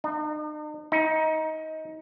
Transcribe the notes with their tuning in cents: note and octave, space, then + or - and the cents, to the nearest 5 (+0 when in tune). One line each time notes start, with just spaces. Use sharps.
D#4 -45
D#4 +20